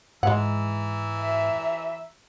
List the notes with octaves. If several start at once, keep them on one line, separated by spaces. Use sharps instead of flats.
G#2 E3 G#3 F#5 A#5 E6
E5